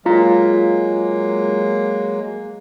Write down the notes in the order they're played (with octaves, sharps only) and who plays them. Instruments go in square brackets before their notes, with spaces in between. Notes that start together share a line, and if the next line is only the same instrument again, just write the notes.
[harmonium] F#3 G#3 A#3 [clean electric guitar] F4 F5 A#5